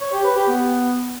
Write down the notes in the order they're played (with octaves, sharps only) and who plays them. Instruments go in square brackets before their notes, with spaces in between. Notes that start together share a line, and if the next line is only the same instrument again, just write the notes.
[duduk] C#5
G4
B4
G4
B3